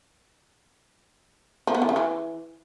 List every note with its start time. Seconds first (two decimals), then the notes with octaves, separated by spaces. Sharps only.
1.67 F3
1.75 B3
1.82 E3
1.89 C#3
1.96 E3